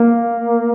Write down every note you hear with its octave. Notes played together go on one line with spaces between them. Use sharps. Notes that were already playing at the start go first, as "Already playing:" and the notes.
Already playing: A#3